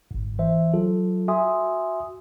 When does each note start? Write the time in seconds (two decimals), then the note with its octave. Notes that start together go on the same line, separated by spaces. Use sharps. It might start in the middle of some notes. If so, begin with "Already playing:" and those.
0.11 G1 G#2
0.39 E3 C5 E5
0.73 F#3 F4 A4
1.28 F#4 E5 G#5 C6 D#6